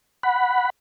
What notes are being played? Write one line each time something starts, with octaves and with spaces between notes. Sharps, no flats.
F#5 B5